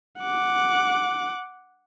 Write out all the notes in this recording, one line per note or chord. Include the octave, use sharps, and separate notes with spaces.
F#5 D6